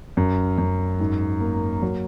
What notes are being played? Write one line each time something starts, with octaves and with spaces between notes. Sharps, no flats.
F#2
F#2
G#2
A#3
F#3